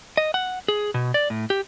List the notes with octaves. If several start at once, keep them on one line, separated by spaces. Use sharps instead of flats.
D#5
F#5
G#4
B2
D5
A2
G4